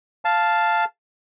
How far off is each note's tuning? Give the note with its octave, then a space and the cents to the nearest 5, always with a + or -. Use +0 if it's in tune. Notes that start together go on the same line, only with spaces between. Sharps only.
F5 -5 A5 +0